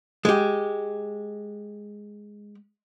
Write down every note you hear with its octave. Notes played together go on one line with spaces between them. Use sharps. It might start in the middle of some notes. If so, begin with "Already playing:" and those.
G#3 G4